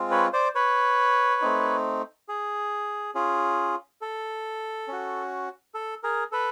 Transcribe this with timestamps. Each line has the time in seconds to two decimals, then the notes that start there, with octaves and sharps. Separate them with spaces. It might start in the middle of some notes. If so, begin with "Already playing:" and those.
Already playing: G#3 C4 F4
0.11 B4 C#5
0.33 C5 D5
0.55 B4 C#5
1.42 A3 C4 D#4
2.29 G#4
3.15 C#4 F4 G#4
4.01 A4
4.88 C#4 F#4
5.74 A4
6.03 G#4 A#4
6.32 A4 B4